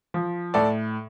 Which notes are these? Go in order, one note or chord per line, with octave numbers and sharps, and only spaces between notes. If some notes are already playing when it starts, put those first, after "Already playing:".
F3
A2 A4 D5